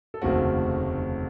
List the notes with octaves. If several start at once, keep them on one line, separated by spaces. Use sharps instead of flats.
A4
F1 D#2 C#3 A3 C4 F#4